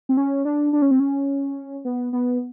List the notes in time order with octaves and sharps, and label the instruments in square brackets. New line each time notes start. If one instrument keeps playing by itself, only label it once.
[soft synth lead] C4
C#4
D4
D4
C#4
C4
C#4
B3
B3